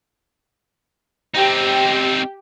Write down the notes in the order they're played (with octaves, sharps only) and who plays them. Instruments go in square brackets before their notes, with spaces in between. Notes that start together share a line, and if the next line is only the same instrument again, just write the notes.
[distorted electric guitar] C4 D#4 [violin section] G4